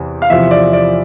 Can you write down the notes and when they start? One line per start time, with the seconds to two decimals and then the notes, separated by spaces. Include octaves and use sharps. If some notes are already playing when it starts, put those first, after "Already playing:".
Already playing: E2 C3 E3
0.22 F5
0.30 E2 C3 F3 E5
0.51 D5
0.73 D5